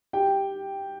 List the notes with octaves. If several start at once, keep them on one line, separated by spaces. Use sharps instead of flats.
G4 G5